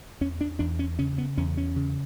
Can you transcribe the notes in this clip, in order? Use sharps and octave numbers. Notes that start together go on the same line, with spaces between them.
E2 C#4
D4
E2 D4
C#4
C#3 C#4
B3
E2 C#4
C#4
C#3